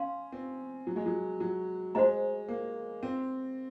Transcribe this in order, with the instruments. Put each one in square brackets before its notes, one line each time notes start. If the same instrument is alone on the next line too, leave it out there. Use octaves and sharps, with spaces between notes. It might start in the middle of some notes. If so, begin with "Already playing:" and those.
Already playing: [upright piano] C#4 [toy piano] F5 C6
[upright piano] C4
F#3
G#3
F#3
F#3
[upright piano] G#3 [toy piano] F#4 C5 D#5 A#5
[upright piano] A#3
C4